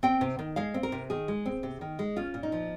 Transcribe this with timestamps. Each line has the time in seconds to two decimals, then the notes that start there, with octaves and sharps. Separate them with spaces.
0.03 C4 G5
0.21 C3
0.39 D#3
0.56 G#3 F5
0.74 C4
0.83 A#4
0.92 C3
1.10 D#3 G#4
1.28 G#3
1.46 C4
1.63 C3
1.81 D#3
1.99 G#3
2.16 C#4 F4
2.34 A#2
2.43 D#4
2.52 F3